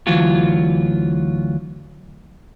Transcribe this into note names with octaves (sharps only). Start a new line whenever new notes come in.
D2 E3 F#3 F4